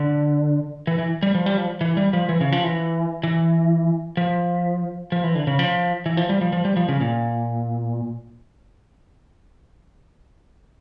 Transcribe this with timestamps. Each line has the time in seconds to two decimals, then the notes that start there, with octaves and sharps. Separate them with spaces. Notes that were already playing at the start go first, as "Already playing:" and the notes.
Already playing: D3
0.87 E3
0.99 E3
1.23 G3
1.35 F3
1.46 G3
1.58 F3
1.81 E3
1.97 G3
2.13 F3
2.29 E3
2.41 C#3
2.52 F3
2.64 E3
3.23 E3
4.17 F3
5.12 F3
5.24 E3
5.35 D3
5.47 C#3
5.59 F3
6.06 E3
6.17 F3
6.29 G3
6.41 F3
6.53 F3
6.65 G3
6.77 F3
6.89 C#3
7.01 A#2